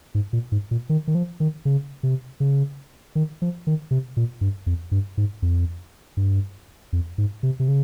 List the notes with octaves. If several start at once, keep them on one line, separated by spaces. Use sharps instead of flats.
G#2
A#2
G#2
A#2
D#3
D#3
F3
D#3
C#3
C3
C#3
D#3
F3
D#3
C3
A#2
G2
F2
G2
G#2
F2
G2
F2
G#2
C3
C3
C#3